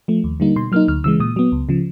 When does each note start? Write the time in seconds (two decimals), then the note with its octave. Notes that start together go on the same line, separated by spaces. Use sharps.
0.08 F3 A3
0.24 D#2
0.40 D3 G3 A#3 D#4
0.56 B2 C6
0.72 F#3 A#3 D#4 F6
0.88 D2 F6
1.04 C#3 E3 G#3 E6
1.20 A#2 D#6
1.36 F#3 B3
1.52 C#2
1.69 C#3 F3